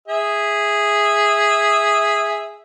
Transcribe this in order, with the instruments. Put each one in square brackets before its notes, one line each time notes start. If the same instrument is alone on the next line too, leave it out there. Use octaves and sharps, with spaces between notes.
[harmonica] G#4 E5